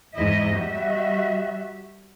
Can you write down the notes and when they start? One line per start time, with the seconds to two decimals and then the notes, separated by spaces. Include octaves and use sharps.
0.14 E2 G#2 E4 D#5 E5
0.56 G3 F#4 E5